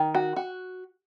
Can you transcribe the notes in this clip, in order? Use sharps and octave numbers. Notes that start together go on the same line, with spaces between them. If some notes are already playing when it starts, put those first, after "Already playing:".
Already playing: D#3
F#4
F#4